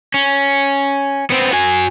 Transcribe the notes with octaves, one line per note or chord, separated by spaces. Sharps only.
C#4
B3 C4
F#4 G#5